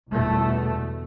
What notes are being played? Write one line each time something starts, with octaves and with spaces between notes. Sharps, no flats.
G1 E2 B2 A3